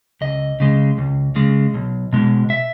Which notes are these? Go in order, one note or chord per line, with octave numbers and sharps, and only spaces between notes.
C#2 D#5
C#3 G#3
C#2
C#3 G#3
B1
B2 G#3
E5